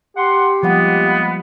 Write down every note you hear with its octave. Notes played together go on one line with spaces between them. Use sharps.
G4 F#5 C6
F3 G3 G#3 A#3 B3 F#5